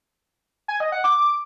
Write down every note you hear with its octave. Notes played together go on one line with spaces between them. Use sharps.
G#5
D#5
F#5
D6